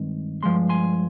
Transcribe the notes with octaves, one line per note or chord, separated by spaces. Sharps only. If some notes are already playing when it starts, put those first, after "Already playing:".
Already playing: G2 D#3 G#3 C4
G2 F3 G#3 C6
G#5 C6